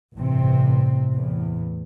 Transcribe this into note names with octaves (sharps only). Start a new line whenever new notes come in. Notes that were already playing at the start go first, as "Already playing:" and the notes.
A1 G2 C3 C4
E2 A2